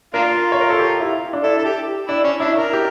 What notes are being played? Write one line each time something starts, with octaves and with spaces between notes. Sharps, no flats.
A#3 D4 F4 A#4
C#5
A#4
A4
G4
E4
D4
E4 A4
A4
G4
D4 E4
C#4
D4 E4
A#4
G4